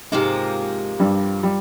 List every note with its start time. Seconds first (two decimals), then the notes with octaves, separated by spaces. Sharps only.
0.12 G#2 C3 F3 G#3 A#3
1.00 G2 G3
1.43 G3